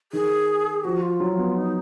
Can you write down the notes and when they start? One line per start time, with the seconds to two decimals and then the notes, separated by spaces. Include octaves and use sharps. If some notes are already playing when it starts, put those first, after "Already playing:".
0.12 D#3 G#4
0.84 F3 F#4
1.02 F4
1.20 F#3
1.38 B3
1.56 D#4